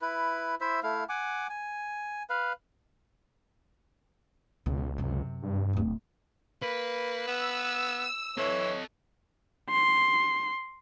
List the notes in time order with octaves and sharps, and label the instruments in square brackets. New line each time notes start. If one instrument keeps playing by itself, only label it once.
[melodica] E4 B4
E4 C5 E5
A3 E4 F5
F#5 G#5 D6
G#5
B4 F5
[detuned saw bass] C#2 [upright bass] B2
[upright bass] F#2 C3
[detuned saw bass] G2
[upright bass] D1 B2
[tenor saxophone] A#3 [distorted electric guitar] B4
[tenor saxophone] B3 [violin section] E6
[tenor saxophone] E3 [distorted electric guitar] A4 D#5 [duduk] C#5
[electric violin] C6